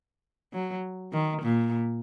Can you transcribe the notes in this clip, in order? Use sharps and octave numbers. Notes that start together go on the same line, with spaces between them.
F#3
D#3
A#2